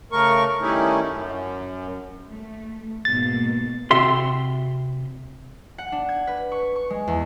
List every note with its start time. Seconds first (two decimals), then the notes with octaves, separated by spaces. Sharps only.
0.12 C#3 A3 A#4 C#6
0.61 D#3 G3 A3 C#4 D#4 E4
1.07 F#2
2.31 A3
3.05 G#2 B2 A#3 A6
3.91 C3 F#4 E5 C6
5.78 F#5
5.92 D4
6.09 G#6
6.27 B4
6.52 C#6
6.76 C#6
6.90 G#3
7.07 E2